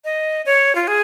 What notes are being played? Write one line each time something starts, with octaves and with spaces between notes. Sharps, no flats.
D#5
C#5
F4
G#4